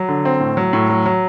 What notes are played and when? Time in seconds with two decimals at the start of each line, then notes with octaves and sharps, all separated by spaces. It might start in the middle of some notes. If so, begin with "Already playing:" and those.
Already playing: F#3
0.09 D3
0.25 C4
0.40 A2
0.57 F#3
0.73 A2
0.90 F#3
1.06 F#3